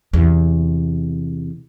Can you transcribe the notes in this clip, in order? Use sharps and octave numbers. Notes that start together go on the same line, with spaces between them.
E2 C3